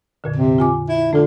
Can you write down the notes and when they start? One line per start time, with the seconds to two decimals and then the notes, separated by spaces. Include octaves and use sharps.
0.24 F2 A#2 D3
0.36 C3
0.58 F4 G#5 D6
0.88 E4
1.13 D3 A3 F4